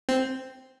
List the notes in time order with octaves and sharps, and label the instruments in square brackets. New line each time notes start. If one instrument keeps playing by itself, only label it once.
[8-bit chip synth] C4